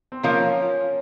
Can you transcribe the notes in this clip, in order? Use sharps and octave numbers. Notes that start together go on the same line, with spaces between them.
C4
F3 A#3 C#4 F4 A#4
C#4